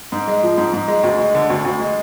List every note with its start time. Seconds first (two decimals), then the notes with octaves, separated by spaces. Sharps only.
0.12 G#2
0.27 G#3
0.43 F3
0.58 G#2
0.73 G#2
0.88 G#3
1.04 D2
1.19 G#3
1.35 D3
1.50 D2
1.65 D2
1.80 G#3